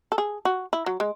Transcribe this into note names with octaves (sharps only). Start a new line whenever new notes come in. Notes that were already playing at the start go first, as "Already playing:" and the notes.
A4
G#4
F#4
E4
F#3
G#3